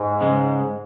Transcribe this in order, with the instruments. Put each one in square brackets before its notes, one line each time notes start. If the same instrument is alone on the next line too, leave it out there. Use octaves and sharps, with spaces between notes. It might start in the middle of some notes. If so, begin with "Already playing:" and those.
Already playing: [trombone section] G#2
[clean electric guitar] C#3 G#3